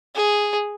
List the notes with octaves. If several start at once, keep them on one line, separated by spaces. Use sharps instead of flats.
G#4